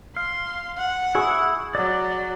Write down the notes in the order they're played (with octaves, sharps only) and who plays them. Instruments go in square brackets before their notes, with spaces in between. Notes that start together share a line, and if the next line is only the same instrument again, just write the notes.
[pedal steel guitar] F5 [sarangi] C6
[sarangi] F#5
[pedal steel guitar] E4 C#6 [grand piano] G#4
[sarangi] F#3 [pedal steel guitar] D5